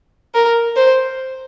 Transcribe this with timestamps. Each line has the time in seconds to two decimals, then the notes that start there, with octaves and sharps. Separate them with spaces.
0.35 A#4
0.76 C5